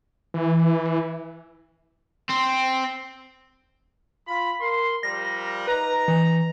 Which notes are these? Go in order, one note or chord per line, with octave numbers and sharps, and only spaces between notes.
E3
C4
F4 B5
A#4 C6
F3 G3 A#4 A#6
D#4 B4 A#5
E3